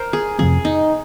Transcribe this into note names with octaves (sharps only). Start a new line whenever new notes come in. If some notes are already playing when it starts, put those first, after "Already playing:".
Already playing: A#4 C5
G#4
F2 C3 F3 C4 G#4
D#4